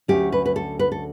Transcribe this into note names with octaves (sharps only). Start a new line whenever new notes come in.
D2 D3 F#3 A3 C#4 G4
B4
B4
A4
B4
A4